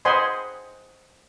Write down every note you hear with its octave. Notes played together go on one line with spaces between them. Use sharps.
C5 D#5 F#5 G#5 B5 C6